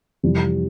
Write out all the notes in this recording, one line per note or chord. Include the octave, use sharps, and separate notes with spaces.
F2 C3 E3 G3